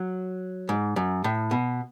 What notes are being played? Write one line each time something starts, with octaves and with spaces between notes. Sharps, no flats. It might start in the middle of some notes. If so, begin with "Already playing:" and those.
Already playing: F#3
G#2
F#2
A2
B2